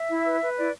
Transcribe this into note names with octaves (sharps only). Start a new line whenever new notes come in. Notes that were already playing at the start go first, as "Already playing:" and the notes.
Already playing: E5
E4
B4
B4
E4 D5